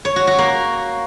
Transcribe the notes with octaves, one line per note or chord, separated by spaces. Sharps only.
C#5
F#4
F#4
A#3